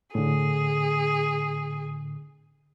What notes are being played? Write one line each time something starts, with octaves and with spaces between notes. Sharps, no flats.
A2 D3 G#4